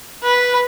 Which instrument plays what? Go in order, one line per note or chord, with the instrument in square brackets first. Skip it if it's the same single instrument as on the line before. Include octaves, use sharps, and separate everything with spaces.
[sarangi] B4